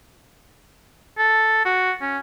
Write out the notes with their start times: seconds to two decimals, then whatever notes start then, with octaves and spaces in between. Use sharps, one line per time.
1.18 A4
1.66 F#4
2.01 C#4